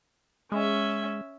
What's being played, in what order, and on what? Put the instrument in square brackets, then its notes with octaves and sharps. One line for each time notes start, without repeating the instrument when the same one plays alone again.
[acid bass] G#3 [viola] C#4 E5